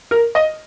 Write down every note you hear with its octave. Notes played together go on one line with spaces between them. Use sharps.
A#4
D#5